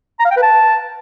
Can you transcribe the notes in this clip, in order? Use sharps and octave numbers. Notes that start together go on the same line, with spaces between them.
A#5
F5
G5
B4
A5